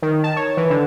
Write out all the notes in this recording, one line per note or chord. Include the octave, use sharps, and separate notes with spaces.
D#3
A5
C#5
E3
D3